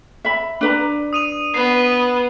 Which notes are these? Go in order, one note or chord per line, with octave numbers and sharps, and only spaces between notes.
E5 B5
D4 B4 A#5
D#6 D#7 F7
B3 C7